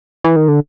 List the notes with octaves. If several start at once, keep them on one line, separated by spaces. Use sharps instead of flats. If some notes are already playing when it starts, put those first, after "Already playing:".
E3
D#3
D3